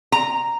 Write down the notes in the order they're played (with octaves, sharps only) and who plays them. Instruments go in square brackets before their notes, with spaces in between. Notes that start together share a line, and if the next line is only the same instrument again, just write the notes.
[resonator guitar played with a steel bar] A#5